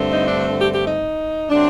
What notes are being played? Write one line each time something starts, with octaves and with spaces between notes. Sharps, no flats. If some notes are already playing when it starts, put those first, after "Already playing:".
Already playing: G2 D3 A3 C4
D#4
D4
G4
G4
D#4
C3 F#3 A3 C4 D4